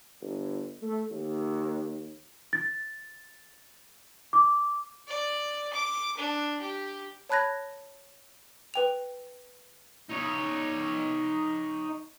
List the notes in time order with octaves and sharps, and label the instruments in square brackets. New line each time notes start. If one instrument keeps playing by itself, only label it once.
[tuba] G1
A3
D#2
[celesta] A6
D6
[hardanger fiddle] D5
D6
D4
G4
[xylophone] C#5 A5 B5 F#6 G#6 A#6
B4 G5 F7
[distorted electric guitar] D#4 C#5